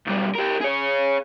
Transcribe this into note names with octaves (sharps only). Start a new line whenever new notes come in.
B1 G3
G4 A#4
G#4 C#5